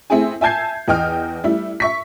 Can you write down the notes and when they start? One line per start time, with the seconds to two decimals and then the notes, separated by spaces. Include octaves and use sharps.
0.10 A3 C4 E4 G#4 G#5
0.41 E5 G#5 A5 G6 G#6 C7
0.88 E2 D#5 G5 F6
1.44 G3 A3 E4 E5
1.80 E5 C#6 B6